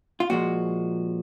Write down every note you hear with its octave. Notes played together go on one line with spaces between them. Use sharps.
F4
A#2 F3 G#3 F#4